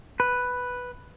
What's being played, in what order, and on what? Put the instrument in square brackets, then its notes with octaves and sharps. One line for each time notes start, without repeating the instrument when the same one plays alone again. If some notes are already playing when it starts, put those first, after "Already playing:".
[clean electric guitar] B4